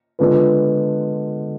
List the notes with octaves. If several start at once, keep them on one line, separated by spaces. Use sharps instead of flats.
D3 G#3 B3 F4 B4